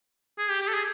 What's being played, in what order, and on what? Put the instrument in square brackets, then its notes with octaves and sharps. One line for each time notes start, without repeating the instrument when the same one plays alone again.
[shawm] G#4
G4
G4
A4
G#4